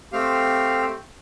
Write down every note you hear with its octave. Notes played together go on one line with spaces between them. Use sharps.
A3 C4 G4 F5